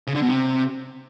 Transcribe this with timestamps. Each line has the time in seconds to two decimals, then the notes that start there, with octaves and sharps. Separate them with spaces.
0.07 C#3
0.15 D3
0.22 B2
0.29 C3